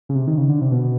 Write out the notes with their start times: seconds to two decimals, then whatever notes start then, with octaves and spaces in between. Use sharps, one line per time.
0.09 C#3
0.15 C3
0.27 D#3
0.38 C#3
0.50 D3
0.61 C3
0.71 B2